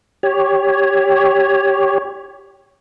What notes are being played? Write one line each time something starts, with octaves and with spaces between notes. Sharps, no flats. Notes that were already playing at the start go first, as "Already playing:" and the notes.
G4 C#5